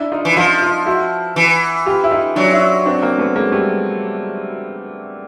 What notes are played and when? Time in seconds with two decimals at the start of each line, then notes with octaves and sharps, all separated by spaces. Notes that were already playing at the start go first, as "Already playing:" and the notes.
Already playing: D4 E4
0.12 D#4 F4
0.25 E3
0.37 F3 D#4 F4
0.62 D#4 F4
0.86 E4 F#4
1.36 E3
1.86 F4 G4
2.04 E4
2.11 D#4 F4
2.36 F#3 D4 E4
2.52 D4 E4
2.85 C4 D4
3.02 A#3 C4
3.18 A3 B3
3.36 G#3 A#3
3.52 G3 A3